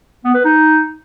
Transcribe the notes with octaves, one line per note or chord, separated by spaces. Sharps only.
B3
B4
D#4